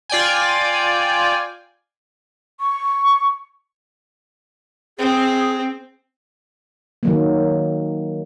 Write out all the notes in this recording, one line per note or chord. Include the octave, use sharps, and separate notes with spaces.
F4 D5 G5 G#5
C#6
C4 G#4
D#3 F#3 A#3